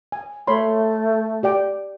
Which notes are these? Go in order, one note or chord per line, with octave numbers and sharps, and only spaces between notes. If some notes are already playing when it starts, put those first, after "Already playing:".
G#5
A3 C#5 B5 C6
G4 D5 G5